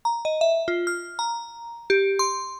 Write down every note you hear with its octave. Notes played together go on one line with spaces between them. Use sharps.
A#5
D#5
E5
F4
F6
A#5
G4
C6